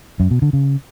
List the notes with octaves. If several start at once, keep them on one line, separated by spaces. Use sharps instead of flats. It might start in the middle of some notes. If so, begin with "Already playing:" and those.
F#2
B2
D3
C#3